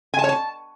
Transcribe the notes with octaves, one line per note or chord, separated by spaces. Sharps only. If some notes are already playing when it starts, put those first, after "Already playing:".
G#5
A5
C#5
A5